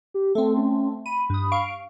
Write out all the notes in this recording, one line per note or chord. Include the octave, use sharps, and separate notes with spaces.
G4
A3 C4 A4
C#4
B5 D#7
G2 D#6
F5 C#6 D7